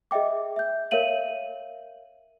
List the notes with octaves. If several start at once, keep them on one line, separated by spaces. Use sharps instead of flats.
G#4 D#5 E5 G5 D6
E5 G6
A#4 C#5 E5 F5 D#7 F#7